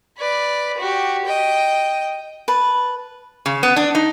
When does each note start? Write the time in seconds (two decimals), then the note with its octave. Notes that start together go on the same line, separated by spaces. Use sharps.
0.18 B4 D5
0.78 F#4 G4
1.26 D#5 G5
2.48 B4 A5
3.46 C#3
3.63 B3
3.76 D4
3.95 D#4